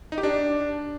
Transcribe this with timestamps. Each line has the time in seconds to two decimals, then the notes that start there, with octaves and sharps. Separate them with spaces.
0.12 D#4
0.18 G4
0.23 D4